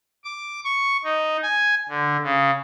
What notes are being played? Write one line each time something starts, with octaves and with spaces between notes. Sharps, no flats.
D6
C#6
D#4
G#5
D3
C#3